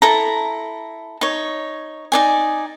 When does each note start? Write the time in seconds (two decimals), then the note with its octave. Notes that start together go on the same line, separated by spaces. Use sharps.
0.02 E4 A4 A#5
1.21 D#4 C#5
2.12 D#4 D5 G#5